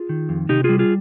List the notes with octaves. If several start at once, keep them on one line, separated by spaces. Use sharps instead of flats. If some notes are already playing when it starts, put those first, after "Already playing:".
Already playing: F4 G#4
D#3
F2
C3 D#4 G4
G3 F4 G#4
F4 G#4